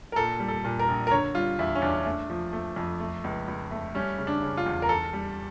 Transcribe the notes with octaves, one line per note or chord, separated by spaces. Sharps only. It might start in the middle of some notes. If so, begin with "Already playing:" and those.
A#4
A#2 A4
G3
A4
A#2
A#4
A#1
A#4
D3 C#5
G3 F4
E2 E4
C#4
E2 D4
A3
F3
A3
F2
A3
C#2
C#2
A3
G3 C#4
C#3
D4
C#3
F4
E2
A#4
E2 A4
G3